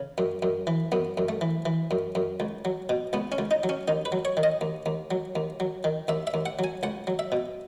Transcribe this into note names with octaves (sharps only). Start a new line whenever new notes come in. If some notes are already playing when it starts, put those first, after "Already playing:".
Already playing: C#3
F#2
F#2
E3
F#2 B3
F#2
A3
E3
E3
F#2
F#2
C#2
F#3
B2
C#2 B3
C#4
C#2
D#4
F#3
C#4
D#2 D#4
B4
F#3
C#5
D#3
D#5
D#2
D#2
F#3
D#2
F#3
D#3
D#2 E5
E5
D#2
F#5
F#3 G#5
C#2 F#5
F#3
E5
B2